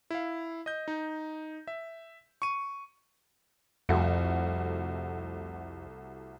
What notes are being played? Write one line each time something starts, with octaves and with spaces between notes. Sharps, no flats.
E4 F5
D#5 G6
D#4
E5
C#6 D#7
C2 F2 A3 F#4